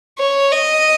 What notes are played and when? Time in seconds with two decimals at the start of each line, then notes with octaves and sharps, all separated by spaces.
0.18 C#5
0.51 D#5